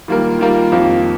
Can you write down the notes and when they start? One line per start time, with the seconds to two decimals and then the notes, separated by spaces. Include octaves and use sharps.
0.08 D#3 G3 A#3 F4 A#4
0.39 D#3 G3 A#3 F4 A#4
0.72 F2 D#3 A#3 F4